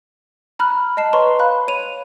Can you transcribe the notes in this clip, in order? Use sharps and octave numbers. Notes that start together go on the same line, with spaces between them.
A#5 B5 F6 F#6
D#5 A5 C7 E7
B4 C#5 A#5 C6 C#6
F5 B5 F#6
C#5 D#7 F7